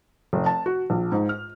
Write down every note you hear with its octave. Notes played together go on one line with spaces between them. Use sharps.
F1
A5
F#4
A#1
G#2
F6